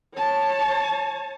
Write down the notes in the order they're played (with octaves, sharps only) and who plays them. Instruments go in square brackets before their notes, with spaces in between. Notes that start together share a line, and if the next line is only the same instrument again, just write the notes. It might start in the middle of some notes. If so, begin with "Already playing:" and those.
[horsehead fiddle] C#5 A5